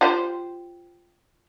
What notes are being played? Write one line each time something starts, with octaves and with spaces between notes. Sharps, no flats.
F4 G4 C5